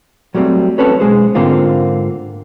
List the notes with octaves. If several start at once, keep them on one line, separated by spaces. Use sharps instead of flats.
F#3 G3 A3 A#3 C4
C4 C#4 A4 B4 C#5
B1 G#2 G#3 G#4 C5
G#2 D3 A#3 C4 F4